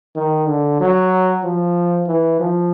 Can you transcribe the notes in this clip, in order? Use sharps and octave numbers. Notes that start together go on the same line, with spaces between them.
D#3
D3
F#3
F3
E3
F3